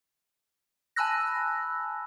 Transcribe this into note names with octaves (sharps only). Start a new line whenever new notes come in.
G#5 A5 B5 E6 F#6 A#6